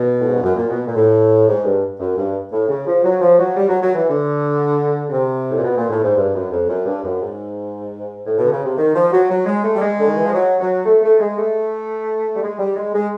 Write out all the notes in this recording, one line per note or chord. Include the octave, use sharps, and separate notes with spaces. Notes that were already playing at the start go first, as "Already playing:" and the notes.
Already playing: B2
A2
G#2
G2
F#2
A#2
B2
A#2
A2
G#2
G2
F#2
G2
A2
C#3
F3
F#3
F3
F#3
G3
F#3
F#3
E3
D3
C#3
C3
A2
A#2
B2
A#2
A2
G#2
G2
F#2
F2
F#2
G2
F#2
G#2
A2
B2
D3
C#3
C3
D#3
F3
F#3
F#3
G#3
A3
G3
G#3
D3
D#3
E3
F3
F#3
F#3
A3
A3
G#3
A3
G3
G#3
G3
G#3
G#3